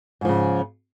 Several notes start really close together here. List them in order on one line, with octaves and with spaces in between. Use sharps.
G#2 F3 C#3